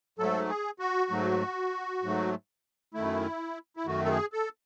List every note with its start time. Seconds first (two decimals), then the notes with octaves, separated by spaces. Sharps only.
0.19 G#2 F#3 A3 A4
0.49 G#4
0.79 F#4
1.10 G#2 F#3 A3
2.03 G#2 F#3 A3
2.94 F#2 D#3 A3 E4
3.77 E4
3.86 F#2 D#3 A3 F#4
4.05 A4
4.10 G#4
4.33 A4